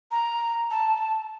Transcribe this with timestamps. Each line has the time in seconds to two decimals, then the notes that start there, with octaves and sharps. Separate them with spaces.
0.11 A#5
0.71 A5